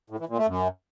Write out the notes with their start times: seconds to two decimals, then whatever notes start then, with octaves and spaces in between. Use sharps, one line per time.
0.10 A2
0.19 E3
0.29 A#2
0.38 A3
0.47 F#2